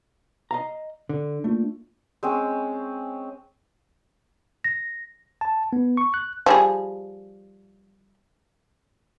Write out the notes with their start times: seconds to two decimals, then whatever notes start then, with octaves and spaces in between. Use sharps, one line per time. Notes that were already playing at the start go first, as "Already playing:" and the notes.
0.51 D#5 F5 A#5
1.09 D3
1.44 A3 A#3 D4 F4
2.23 G#3 C4 C#4
4.64 A#6
5.41 A5
5.73 B3
5.97 C#6
6.14 F#6
6.46 F3 G3 G#4